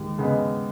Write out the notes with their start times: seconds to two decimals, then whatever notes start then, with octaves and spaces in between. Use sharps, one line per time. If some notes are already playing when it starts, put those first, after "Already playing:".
Already playing: D#2 G#2
0.18 C#3 B3 D#4